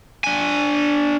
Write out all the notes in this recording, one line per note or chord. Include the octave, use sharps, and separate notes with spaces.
D4 G#5